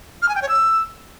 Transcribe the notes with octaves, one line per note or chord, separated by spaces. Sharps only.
F6
G#5
G5
C#5
E6